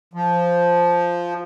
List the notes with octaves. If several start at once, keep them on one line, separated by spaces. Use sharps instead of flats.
F3